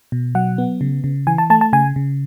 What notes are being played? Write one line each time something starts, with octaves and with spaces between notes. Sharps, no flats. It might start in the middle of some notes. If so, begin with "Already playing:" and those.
B2
F#3 F#5
B3
C#3
C#3
E3 G#5
A5
A3 A5
A5
C#3 G#5
C#3